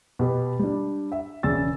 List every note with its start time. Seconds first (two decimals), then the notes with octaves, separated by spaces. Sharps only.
0.19 B2 G4 B4
0.59 G3 D4
1.12 E5
1.43 E1 C#3 D5 E6 A6